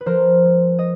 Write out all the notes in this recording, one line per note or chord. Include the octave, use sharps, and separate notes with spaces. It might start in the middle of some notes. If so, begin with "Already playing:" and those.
B4
F3 A#4 C5
G#3
D#5